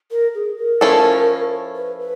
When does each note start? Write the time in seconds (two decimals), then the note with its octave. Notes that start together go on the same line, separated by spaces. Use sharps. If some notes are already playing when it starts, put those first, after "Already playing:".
0.11 A#4
0.35 G#4
0.58 A#4
0.81 F3 A3 C#4 E4 A4
1.76 B4
2.00 B4